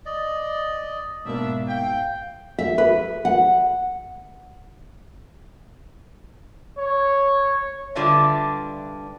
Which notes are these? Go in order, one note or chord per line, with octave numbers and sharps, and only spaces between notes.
D5 D#5
G#2 B2 A#3 D4 E5
F5 G5
E5
B4
F#5
C#5
G2 D3 D4 F4 E5